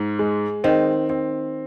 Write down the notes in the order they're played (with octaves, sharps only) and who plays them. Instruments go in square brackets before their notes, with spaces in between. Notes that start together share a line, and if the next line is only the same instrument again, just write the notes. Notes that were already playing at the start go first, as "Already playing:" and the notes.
Already playing: [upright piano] G#2
G#3
[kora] D#3 [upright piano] C4
[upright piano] C4